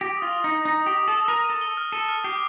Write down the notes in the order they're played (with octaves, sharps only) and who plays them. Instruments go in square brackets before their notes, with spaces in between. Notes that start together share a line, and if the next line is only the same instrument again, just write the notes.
[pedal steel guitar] G4 [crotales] A#6
[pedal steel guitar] F4 [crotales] D#6
[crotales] D#6
[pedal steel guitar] D#4 [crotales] A#6
[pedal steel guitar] D#4 [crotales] A#6
[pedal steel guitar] G4 [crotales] D#6
[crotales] D#6
[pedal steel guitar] A4 [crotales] D#6
[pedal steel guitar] A#4 [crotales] D#7
[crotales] D#7
[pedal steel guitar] A4
[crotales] G7
F6
[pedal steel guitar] A4 [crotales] D#7
[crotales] F6
[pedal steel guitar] G4 [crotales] C7